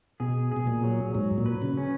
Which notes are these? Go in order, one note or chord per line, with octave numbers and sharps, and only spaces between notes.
B2 G#4
B2 G#4
A#2
F#3
G#2 F#3
A#2
B4
C#3
C#4